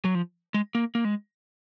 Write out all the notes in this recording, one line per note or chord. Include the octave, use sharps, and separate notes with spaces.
F#3
F3
G#3
A#3
A#3
G#3